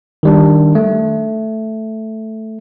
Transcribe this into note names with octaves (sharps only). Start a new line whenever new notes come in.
D#3 G3 D4
A3